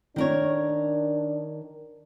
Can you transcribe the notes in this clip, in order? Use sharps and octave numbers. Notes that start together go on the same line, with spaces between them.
D#3 D4 A#4 C#5